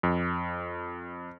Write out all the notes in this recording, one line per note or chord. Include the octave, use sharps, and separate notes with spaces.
F2